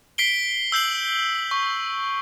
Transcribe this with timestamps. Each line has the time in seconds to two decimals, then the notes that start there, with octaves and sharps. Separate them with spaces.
0.18 B6 C7 D7 G7
0.72 E6 G6 C7 F#7
1.51 C#6